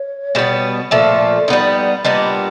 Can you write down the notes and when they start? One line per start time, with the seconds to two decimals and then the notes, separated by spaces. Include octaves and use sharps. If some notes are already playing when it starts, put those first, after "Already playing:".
Already playing: C#5
0.35 B2 G3 B3
0.91 A#2 F3 A3 D5
1.48 G3 B3 D#4
2.05 A#2 G3 B3 D4 D#5